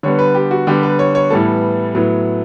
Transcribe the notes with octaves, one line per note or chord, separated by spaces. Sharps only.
D3 G3 B3 C#5
B4
G4
F#4
D3 G3 B3 G4
B4
C#5
C#5
A2 E3 G3 B3 A4
A2 F#3 B3